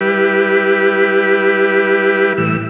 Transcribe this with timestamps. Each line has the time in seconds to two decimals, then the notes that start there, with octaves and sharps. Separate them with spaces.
0.01 G3 E4 G4 B4
2.38 A2 E3 E6